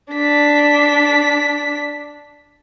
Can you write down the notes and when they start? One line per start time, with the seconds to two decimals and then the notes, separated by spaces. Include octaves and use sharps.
0.12 D4 B6